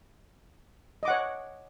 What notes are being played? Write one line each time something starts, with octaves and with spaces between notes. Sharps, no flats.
C#5 D#5 F#5 D6